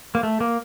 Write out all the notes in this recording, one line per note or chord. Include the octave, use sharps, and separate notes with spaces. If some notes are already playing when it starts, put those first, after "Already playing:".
A#3
A3
A#3